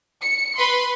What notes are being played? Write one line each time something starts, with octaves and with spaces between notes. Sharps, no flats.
C#7
B4 B5 C6